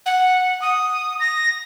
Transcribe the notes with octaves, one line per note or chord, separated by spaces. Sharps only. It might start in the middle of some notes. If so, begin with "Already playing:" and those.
F#5
D#6
A#6